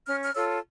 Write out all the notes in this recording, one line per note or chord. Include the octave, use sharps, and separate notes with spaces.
C#4 F6
F6
F4 A4 C#5 E6